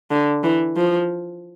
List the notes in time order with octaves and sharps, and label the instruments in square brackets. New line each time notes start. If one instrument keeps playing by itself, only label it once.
[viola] D3
E3
F3